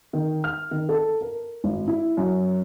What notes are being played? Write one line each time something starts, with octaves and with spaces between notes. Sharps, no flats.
D#3
F6
D#3
A4
A#4
G#1
E4
F#2